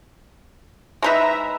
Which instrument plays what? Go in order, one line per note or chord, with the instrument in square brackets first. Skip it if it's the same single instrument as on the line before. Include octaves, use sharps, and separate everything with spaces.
[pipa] G#3 D#4 B4 [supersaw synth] E5 A#5